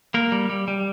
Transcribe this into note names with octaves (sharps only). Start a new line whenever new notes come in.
A#3 A#4
G3
G3
G3